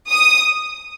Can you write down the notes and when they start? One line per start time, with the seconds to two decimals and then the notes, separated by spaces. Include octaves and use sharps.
0.10 D#6